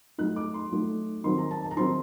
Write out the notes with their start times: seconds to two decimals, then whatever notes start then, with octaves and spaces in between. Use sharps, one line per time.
0.18 F#3 A3 D#4 F#6
0.36 D6
0.54 C6
0.71 F#3 A3 D#4
1.24 D#3 F#3 C4 D#4 C6
1.38 A#5
1.51 A5
1.64 A5
1.71 A#5
1.76 D#3 F#3 C4 D#4 C6